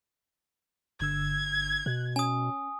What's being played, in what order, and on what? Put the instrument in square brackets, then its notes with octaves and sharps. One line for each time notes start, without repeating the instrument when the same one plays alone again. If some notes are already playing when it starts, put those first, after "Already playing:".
[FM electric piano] G1 D3 E6 [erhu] G#6
[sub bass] B2 [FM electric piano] F#6
[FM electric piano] C#4 [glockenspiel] G#5 D#6